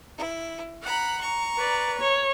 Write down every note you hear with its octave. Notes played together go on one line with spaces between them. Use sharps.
E4
F#5 A#5 B5
A#5 C#6
B4 D5
C#5